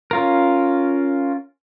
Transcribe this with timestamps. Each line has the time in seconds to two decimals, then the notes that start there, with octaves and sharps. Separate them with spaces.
0.11 C#4 F4 A#4